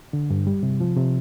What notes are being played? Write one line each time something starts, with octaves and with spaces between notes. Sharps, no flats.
D3
G2
G3
C3
F3
C3